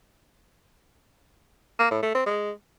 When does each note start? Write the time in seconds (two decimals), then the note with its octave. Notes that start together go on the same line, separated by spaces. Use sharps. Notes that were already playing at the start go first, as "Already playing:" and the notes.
1.79 A#3
1.91 A2
2.03 A3
2.14 C4
2.26 G#3